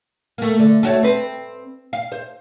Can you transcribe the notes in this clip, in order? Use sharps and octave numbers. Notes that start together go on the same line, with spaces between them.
A3 A#3
D3
A3 F#4 C#5
C4 B4
F5
C5